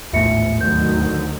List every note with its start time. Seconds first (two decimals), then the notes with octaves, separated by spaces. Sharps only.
0.13 A1 D#2 G#2 A3 F4 E5 C#7
0.61 D2 D#3 F#3 G6